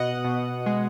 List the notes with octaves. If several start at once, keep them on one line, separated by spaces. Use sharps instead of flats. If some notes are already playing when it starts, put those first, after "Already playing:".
Already playing: B2 D#5 F#5
B2
G#3